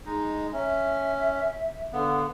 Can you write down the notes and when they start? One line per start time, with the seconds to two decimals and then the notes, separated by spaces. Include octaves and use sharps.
0.06 G#3 D#4
0.53 C#4 E5
1.93 D3 B3 F5